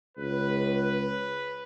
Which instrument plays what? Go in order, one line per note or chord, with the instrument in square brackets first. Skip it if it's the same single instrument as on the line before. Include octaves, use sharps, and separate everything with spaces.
[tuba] C#2 [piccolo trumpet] B4